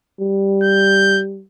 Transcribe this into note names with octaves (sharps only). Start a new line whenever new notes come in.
G3
G6